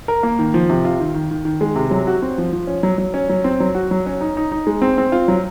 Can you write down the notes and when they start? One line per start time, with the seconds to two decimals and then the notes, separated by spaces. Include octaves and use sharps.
0.08 A#4
0.23 A#3
0.39 D#3
0.54 F3
0.70 C3
0.85 F4
1.00 D#3
1.14 D#3
1.31 D#3
1.45 D#3
1.61 G#3
1.75 C3
1.91 F#3
2.07 F#4
2.22 C4
2.38 F3
2.52 F3
2.67 C#4
2.83 F#3
2.98 F#3
3.14 C#4
3.29 F#3
3.44 C4
3.60 F#3
3.75 F#4
3.91 F#3
4.06 C#4
4.21 D#4
4.37 D#4
4.52 D#4
4.67 G#3
4.82 C4
4.98 C4
5.12 F4
5.28 F#3